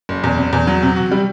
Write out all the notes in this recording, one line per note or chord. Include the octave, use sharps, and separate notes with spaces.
F#1
E2
C3
E2
F#3
C3
F#4
G3